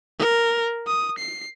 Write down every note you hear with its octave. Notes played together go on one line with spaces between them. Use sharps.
A#4
D#6
C7